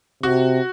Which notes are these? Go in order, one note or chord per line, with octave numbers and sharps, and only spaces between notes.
C3 F#4